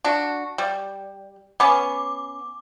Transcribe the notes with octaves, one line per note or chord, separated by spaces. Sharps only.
D4 F#4
G3
B3 C#4 D6